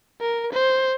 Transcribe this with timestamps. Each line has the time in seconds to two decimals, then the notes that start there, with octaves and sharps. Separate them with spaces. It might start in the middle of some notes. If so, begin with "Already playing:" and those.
0.21 A#4
0.53 C5